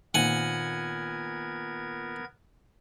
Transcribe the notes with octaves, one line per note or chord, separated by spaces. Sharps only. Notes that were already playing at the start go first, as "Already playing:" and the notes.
A#2 D#3 B3 C4 A#4 F#5 G#5 G#6